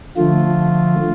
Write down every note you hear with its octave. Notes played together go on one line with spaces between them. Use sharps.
D3 F3 A3 F4